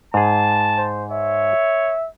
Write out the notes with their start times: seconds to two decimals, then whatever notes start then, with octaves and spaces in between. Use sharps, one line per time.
0.14 G#2 G#4 A5
0.78 C5
1.11 C#5 E5